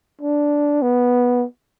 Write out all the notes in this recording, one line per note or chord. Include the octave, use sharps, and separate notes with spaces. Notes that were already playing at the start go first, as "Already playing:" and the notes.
D4
B3